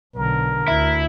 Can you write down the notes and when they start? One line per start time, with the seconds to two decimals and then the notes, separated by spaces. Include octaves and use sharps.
0.16 B1 D3 A#4
0.68 D2 E4